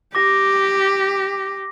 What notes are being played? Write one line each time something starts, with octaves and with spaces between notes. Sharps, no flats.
G4 D6 A#6